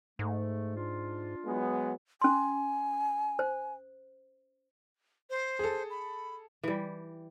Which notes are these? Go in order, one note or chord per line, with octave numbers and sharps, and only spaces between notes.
G#2 A3
D4 F4
F#3 G#3 B3
C#4 G#5 C6
C5
C5
G#4 A4
B5
E3 G3